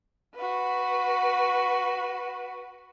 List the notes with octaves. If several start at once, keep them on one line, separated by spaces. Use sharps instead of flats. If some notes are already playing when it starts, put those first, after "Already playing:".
F#4 B4